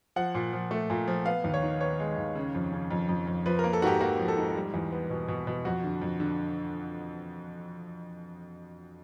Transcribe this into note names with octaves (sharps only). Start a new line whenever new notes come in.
F3 F#5
A#2
F3
A3
A#2
F3
B3 F5
D#2
C#5
D#3
B3 C#5
G#3
D#2
C#3
F2
C#3
F2
F2
F2
F3 B4
A#4
A#3
A4
G#2 F#4 G4
A#3 F#4
F3
A4
G#2
G3
E2
B3
B2
B2
B2
F2 F#4
D3
F2
D3